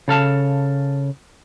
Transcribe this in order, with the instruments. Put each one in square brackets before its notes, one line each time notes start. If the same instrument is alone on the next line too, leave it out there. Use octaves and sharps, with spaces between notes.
[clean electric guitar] C#3 A4 F5 A5